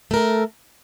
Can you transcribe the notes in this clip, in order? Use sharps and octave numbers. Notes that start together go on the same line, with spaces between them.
A3 A4 A#4